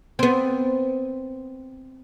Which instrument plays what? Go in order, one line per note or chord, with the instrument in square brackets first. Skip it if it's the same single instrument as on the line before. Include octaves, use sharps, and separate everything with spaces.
[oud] B3 C4